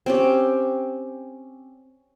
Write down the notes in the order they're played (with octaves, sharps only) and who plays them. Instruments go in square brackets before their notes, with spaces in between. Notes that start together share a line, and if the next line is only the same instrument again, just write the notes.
[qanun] C4 C#4 G4